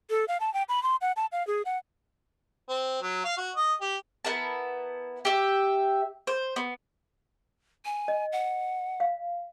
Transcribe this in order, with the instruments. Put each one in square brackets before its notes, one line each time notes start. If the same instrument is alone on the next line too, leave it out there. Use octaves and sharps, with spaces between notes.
[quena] A4
F5
A5
G5
B5
C6
F#5
A5
F5
G#4
F#5
[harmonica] C4
F#3
F5
F#4
D#5
G4
[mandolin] B3 E4 A#4 A5
G4 E5
C5
B3
[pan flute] G#5
[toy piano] D#5
[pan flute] F#5
[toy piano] F5